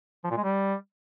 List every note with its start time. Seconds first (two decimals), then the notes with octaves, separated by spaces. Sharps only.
0.24 F3
0.31 A#2
0.37 G#3
0.44 G3